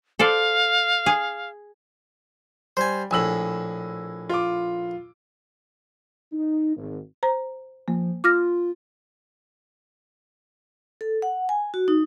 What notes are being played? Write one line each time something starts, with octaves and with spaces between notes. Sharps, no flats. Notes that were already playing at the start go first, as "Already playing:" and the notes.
A4 C5 D5 F5
G#4
G3 C5 G#5
A#1 A2 G#5 E6 F#7
F4 D6
D#4
G#1
C5 A#5
F3 A#3
F4 D6 F6 A#6
A4
F#5
G#5
F#4
D#4